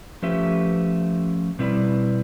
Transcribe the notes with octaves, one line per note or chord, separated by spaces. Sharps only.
F3 A3 C#4 G4 B4 E5
B2 G3 C4 E4 B4 D5